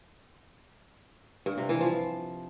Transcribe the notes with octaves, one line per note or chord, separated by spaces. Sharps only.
G2
C3
E3
F3